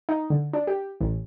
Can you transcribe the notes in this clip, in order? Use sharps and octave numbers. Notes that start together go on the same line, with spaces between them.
D#4
D3
D4
G4
A1